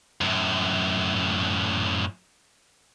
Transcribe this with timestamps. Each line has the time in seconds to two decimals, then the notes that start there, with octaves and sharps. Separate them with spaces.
0.21 F#2 A2